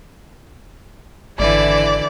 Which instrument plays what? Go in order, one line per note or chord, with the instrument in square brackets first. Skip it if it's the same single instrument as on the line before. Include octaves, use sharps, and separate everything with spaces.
[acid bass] G#1 [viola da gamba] D3 E3 E4 [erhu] D5